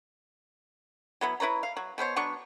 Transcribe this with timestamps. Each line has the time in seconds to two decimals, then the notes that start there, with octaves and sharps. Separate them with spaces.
1.21 F#3 B3 E4
1.40 E4 B4 C#5 A#5
1.63 F5
1.77 F#3
1.98 B2 B3 C5 C#5
2.16 F#3 B3 D4 C#6